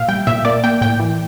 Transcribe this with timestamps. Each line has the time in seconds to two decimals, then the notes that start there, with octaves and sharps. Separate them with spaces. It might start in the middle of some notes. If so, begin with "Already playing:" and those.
Already playing: A#2 E5 F5
0.09 G3 G5
0.27 A#2 E5
0.45 A#3 D5
0.64 A#3 G5
0.81 A2 G5
1.00 E3